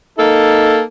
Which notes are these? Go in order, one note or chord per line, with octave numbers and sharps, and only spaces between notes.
A#3 D#4 A4